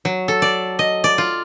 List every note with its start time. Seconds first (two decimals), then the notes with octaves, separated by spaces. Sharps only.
0.05 F#3
0.28 A4
0.42 D5
0.79 D#5
1.04 D5
1.18 F4